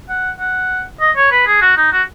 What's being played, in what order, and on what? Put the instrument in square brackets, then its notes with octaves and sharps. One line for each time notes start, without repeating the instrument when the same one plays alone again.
[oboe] F#5
F#5
D#5
C#5
B4
G#4
F#4
D#4
F#4